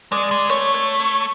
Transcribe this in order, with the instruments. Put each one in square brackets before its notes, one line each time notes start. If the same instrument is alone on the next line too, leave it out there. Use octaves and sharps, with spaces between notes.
[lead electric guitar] G#3 [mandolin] D5
[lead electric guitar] G#3
[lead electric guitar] A3 [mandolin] C#5
[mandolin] C#5
C#5